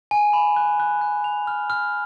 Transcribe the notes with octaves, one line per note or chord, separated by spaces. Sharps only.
G#5
B5
F#6
F#6
F#6
F7
F6
F6